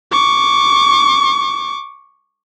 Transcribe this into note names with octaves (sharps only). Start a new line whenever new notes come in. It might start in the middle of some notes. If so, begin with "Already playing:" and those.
C#6 D6